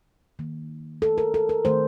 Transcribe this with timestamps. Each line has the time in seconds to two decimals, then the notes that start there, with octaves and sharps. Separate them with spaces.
0.39 D#3 A#3
1.02 A4
1.18 A#4
1.34 A4
1.49 A#4
1.65 D#3 A3 C5